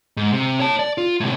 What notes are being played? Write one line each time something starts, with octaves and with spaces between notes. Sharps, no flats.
G#2
C3
C#5 A5
D5
F4
A2 C3